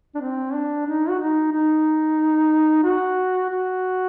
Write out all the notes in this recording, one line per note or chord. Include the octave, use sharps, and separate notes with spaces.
D4
C4
D4
D#4
F#4
D#4
D#4
F#4
F#4